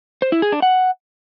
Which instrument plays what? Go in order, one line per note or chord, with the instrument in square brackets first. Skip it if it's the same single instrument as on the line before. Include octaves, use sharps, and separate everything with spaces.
[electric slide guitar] C5
E4
G#4
D4
F#5